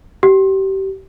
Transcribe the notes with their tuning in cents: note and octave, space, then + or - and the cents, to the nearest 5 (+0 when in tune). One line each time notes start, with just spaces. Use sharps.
G4 -30